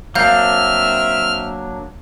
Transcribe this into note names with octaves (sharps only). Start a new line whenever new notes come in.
F#3 A#3 C4 D4 E5 F5 F6 G6